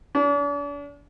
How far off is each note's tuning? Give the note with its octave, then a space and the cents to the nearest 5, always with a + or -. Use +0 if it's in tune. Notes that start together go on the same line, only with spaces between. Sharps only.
D4 -40